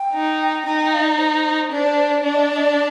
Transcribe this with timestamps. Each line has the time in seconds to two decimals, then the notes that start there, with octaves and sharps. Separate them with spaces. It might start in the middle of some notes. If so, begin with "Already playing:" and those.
Already playing: G5
0.13 D#4
0.66 D#4 G5
0.80 G5
0.92 F5
1.00 D#5
1.05 D5
1.18 C5
1.72 D4
2.23 D4 D5
2.34 D#5
2.45 D5
2.56 D#5
2.66 D5